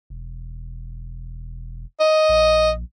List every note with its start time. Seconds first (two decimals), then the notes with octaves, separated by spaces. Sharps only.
0.10 E1
2.00 D#5
2.29 A#1